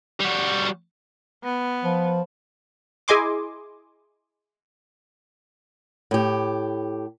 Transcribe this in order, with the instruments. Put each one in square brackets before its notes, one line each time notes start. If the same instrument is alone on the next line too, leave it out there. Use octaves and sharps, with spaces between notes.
[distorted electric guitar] G3 F#4
[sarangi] B3
[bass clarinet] F3
[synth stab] E4 G#4 D#5 G#5 C6 D6
[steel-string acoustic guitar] A2 G4